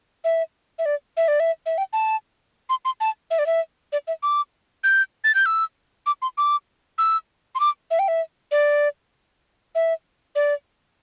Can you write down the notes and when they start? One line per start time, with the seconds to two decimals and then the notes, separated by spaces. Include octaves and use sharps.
0.24 E5
0.79 E5
0.86 D5
1.17 E5
1.28 D5
1.40 E5
1.66 E5
1.78 G5
1.93 A5
2.70 C6
2.85 C6
3.00 A5
3.31 E5
3.39 D5
3.46 E5
3.92 D5
4.08 E5
4.23 D6
4.84 G6
5.24 A6
5.35 G6
5.46 E6
6.06 D6
6.22 C6
6.38 D6
6.98 E6
7.55 C6
7.60 D6
7.91 E5
7.99 G5
8.08 E5
8.51 D5
9.75 E5
10.35 D5